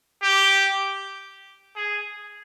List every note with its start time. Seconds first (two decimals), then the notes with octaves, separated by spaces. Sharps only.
0.23 G4
1.76 G#4